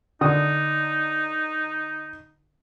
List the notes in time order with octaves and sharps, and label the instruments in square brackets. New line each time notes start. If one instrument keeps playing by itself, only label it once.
[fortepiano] D3 D#6 [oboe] D#4